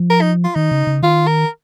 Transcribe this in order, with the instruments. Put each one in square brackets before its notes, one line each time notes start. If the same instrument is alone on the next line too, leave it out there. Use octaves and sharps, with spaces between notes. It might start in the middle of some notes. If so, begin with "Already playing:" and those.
Already playing: [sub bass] F3
[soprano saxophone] A#4
D#4
F4
[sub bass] D#3 [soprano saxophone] D#4
[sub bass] C#3
C#3
[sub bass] D#3 [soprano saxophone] F4
[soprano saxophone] A#4